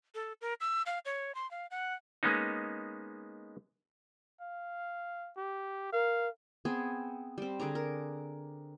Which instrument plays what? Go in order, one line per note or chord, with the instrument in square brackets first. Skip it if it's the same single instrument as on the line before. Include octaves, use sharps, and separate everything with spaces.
[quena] A4
A#4
E6
F5
C#5
C6
F5
F#5
[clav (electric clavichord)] G#3 A#3 B3 C#4 D#4
[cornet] F5
G4
[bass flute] A#4 [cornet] F5
[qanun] B3 C4 G#4
G3 C4
D3 G#4 D5 A#5
A#4